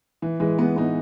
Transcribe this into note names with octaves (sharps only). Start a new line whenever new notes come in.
E3
E3 G#3
G#3 B3
B3 D#4